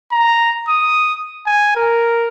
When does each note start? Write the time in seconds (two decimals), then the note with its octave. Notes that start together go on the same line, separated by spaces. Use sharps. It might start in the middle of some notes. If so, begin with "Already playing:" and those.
0.12 A#5
0.69 D#6
1.46 G#5
1.76 A#4